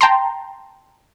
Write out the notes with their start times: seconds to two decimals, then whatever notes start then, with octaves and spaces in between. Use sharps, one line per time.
0.01 G5 A5 A#5 C6